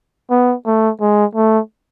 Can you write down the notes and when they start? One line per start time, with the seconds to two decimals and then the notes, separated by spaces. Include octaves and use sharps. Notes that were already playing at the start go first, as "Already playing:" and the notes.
0.31 B3
0.66 A3
1.01 G#3
1.35 A3